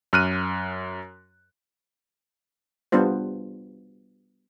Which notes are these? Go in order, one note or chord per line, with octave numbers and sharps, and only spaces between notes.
F#2 F6 F#6 D#7
G3 B3 D4 F4 C5